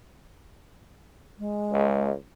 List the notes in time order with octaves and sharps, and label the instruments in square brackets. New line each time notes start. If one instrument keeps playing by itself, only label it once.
[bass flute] G#3
[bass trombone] C#2